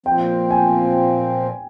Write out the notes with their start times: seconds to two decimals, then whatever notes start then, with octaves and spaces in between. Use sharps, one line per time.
0.06 A#2 F3 C4 G5
0.50 G#5